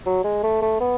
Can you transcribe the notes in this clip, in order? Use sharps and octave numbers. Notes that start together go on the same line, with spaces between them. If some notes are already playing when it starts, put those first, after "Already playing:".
F#3
G#3
A3
A3
B3